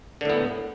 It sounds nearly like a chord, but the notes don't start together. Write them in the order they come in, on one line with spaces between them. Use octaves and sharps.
D3 A2 B3